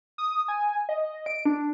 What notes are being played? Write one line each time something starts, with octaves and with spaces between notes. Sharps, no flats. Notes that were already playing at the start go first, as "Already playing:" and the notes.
D#6
G#5
D#5
D7
D4